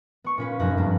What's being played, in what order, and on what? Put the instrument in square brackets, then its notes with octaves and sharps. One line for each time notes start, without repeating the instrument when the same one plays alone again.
[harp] B3 C#6
A#2 C#4 B4
F1 F#2 B3 F#6 A#6
G2 G3 A#3 B3